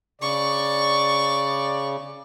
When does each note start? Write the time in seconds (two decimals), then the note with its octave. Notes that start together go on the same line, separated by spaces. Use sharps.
0.22 C#3 D5 C#6